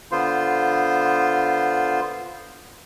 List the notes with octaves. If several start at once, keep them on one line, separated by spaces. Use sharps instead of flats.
D3 B3 F4 C5